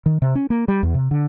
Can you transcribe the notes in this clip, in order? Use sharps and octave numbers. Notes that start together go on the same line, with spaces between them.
D#3
C3
C#4
A#3
G3
E2
C3
D3